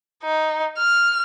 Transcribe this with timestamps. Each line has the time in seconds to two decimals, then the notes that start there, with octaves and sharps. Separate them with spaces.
0.23 D#4
0.78 F6